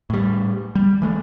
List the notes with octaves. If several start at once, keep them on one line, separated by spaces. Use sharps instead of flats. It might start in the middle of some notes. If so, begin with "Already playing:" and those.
A2 G3
G3
E3 G#3 A3